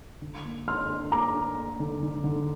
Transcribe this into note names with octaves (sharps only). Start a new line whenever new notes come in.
D3
A#3
D3 C6 F6
D4
A#3 A#5 D6
D4
A#3
D3
D3
D3